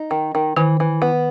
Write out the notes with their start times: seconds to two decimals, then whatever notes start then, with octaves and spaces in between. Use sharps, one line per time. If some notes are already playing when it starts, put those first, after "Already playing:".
Already playing: D#4
0.11 D#3
0.35 D#3
0.57 D#3 E3
0.80 E3
1.02 B3